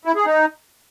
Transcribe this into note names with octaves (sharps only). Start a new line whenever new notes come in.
E4
G#4
D#4